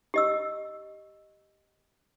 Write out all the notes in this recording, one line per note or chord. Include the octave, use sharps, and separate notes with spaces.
G4 D#5 E6